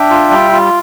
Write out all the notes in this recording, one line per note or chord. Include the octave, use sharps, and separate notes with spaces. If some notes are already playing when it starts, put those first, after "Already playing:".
Already playing: D4 E5 G5
F4
G3
F4